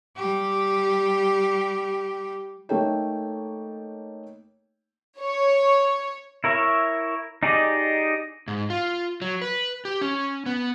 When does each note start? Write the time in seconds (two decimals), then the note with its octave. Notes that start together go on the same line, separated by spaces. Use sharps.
0.17 G3 G4
2.69 A3 A#3 D#4 A4 C#5 G5
5.19 C#5
6.44 E4 A#4 C#5 E5
7.43 D#4 G4 G#4 D5 D#5
8.48 G#2
8.70 F4
9.22 F#3
9.42 B4
9.85 G4
10.01 C#4
10.46 B3